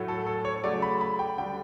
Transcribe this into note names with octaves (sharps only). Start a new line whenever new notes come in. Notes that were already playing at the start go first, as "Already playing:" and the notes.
Already playing: A2 F#3 A3
A4
A4
C#5
C#3 F#3 A3 D5
B5
B5
G5
D3 G3 G5